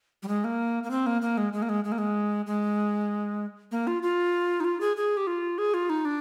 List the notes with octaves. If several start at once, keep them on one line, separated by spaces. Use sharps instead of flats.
G3
G#3
A#3
A#3
C4
A#3
A#3
G#3
G#3
A#3
G#3
G#3
A#3
G#3
G#3
A#3
F4
F4
D#4
F4
G#4
G#4
G4
F4
G#4
F4
D#4
D4